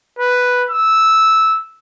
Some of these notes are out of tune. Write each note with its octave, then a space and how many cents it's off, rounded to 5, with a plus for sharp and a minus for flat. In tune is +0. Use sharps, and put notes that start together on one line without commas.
B4 +0
E6 -10